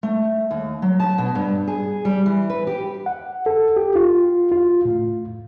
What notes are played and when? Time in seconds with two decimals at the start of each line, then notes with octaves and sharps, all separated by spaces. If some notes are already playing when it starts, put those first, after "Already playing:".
0.03 A3
0.51 D#2
0.82 F#3
1.00 A5
1.18 B2
1.35 G2
1.68 G#4
2.05 G3
2.26 E3
2.50 B4
2.67 G4
3.06 F#5
3.46 A4
3.77 G4
3.96 F4
4.52 F4
4.85 A2